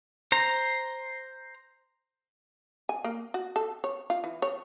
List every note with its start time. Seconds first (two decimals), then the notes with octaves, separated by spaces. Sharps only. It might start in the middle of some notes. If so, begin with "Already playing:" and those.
0.32 C5 A#5
2.89 G#5
3.04 A#3
3.34 F#4
3.56 A4
3.84 C#5
4.10 F4
4.24 E3
4.42 C#5